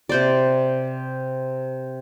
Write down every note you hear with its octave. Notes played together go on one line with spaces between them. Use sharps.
C3 C5 D5